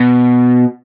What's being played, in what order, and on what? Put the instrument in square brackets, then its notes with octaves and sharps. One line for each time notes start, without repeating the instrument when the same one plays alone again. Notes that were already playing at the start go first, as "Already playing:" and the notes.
Already playing: [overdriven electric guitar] B2